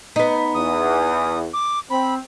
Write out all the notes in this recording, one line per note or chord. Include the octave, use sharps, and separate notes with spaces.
B3 D#4
E2 D#6
D6
C4 B5